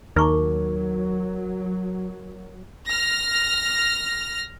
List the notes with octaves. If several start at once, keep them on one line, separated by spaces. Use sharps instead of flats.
D#2 F#3 D#4 A#4 C#6 D6
F6 A#6